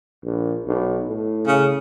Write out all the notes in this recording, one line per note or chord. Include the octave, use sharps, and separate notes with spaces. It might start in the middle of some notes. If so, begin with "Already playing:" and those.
A#1
B1
A2
C#3